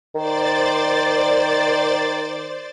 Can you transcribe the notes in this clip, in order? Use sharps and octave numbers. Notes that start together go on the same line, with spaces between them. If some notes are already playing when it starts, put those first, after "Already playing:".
D#3 C5 D5 A6